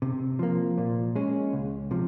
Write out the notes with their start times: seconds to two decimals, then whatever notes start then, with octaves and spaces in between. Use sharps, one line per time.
0.02 C3
0.39 F3 A#3
0.78 A#2
1.15 G#3 C#4
1.53 C#2
1.91 C3 F3